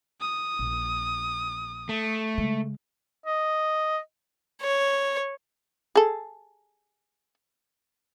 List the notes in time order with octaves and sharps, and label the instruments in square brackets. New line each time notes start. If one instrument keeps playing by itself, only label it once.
[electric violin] D#6
[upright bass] A#1
[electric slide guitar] A3
[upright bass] C#3 G#3
[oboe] D#5
[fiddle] C#5
[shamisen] G#4 A4